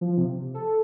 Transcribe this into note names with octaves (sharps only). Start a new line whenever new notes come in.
F3
C3
A4